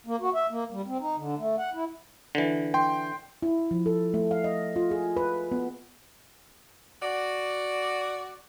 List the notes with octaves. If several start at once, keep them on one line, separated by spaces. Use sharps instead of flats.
A#3
F#4
E5
A#3
G3
C4
D#4
D3
A3
F#5
E4
D3 E3
G5 C6
E4
F3
A4
A3
F5
D#5
F4
G#4
B4
B3
F#4 D5